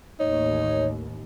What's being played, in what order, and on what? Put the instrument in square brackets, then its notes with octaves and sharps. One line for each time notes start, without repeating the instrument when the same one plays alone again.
[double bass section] A1 D#2 [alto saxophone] D#4 [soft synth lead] C#5